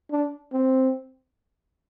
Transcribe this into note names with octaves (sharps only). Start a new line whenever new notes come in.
D4
C4